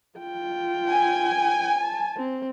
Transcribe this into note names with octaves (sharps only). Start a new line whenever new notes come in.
F4 G5
G#5
A5
C4